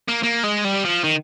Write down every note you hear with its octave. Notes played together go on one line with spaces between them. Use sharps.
A#3
A#3
G#3
G3
F3
D#3